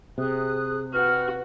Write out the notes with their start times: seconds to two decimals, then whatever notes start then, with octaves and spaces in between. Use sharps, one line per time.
0.18 C3 G#4 D#6 F#6
0.94 F#4 G4 B4 F6